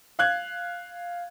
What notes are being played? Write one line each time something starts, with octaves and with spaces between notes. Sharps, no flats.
F5 F#6 G#6